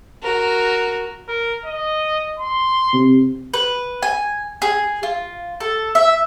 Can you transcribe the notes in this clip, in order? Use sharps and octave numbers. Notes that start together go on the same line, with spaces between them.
F#4 A#4
A#4
D#5
C6
C3
B4
G#5
G#4
F4
A4
E5